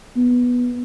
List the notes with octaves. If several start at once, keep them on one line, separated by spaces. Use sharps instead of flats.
B3